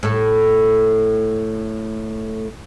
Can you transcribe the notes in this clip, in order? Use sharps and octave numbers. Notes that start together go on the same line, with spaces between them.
A2 A4